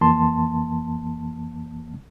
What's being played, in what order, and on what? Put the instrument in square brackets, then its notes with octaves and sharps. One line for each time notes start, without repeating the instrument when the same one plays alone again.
[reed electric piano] F2 E3 A#3 A5 C6